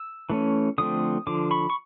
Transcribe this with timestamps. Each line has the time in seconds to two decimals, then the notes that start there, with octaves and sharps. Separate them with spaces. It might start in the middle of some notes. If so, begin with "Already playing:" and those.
Already playing: E6
0.30 E3 A3 C#4
0.78 D3 F3 A3 C4 D#6
1.27 D3 F3 D6
1.51 B5 C#6
1.70 C#6